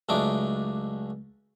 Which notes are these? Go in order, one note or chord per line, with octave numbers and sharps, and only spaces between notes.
C#2 F#2 A3 D4 D#4 D6